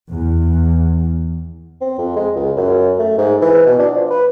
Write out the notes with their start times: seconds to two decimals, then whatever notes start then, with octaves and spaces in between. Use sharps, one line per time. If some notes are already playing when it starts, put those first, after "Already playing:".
0.11 E2
1.81 C4
1.98 F2
2.16 G#3
2.36 C#2
2.57 F#2
2.99 A3
3.18 G#2
3.41 E3
3.66 B2
3.79 D4
3.95 F3
4.10 B4